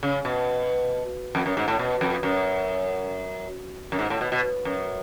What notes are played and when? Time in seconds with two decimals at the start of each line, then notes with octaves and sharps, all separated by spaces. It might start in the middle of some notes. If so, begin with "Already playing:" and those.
0.03 C#3
0.25 B2
1.35 F2
1.46 F#2
1.57 G#2
1.68 A2
1.79 B2
2.01 F2
2.23 F#2
3.92 F#2
3.99 G#2
4.10 A2
4.21 B2
4.32 B2
4.65 F#2